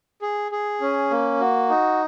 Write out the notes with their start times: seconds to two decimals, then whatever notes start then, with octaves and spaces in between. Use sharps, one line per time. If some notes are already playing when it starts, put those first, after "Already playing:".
0.22 G#4
0.52 G#4
0.81 C#4
1.11 A#3
1.40 F#4
1.70 D#4